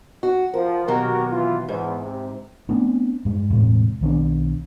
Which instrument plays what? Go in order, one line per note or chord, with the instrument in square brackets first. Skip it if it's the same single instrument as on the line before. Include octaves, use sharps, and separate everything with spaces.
[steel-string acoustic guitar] F#4
[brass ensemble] F3 [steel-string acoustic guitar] A#4
[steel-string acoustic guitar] D#2 B2 F#3 [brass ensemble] F#4 G4 A#4
[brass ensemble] E3 F4
[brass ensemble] E2 [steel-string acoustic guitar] G#2
[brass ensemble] C3
[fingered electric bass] A3 B3 C4 D4
G2 G#3
E1 A2 C3 G#3
B1 D#3 B3 D4